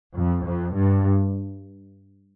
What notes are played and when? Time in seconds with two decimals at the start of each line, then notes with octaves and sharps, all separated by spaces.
0.13 F2
0.43 F2
0.74 G2